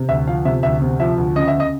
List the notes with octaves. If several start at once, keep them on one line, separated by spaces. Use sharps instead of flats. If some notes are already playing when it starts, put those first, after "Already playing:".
Already playing: C3
D2 E5
F3 F5
C3 E5
D2 E5
C3
F3 E5
D2
C#3 D#5
E5
C#3
D#5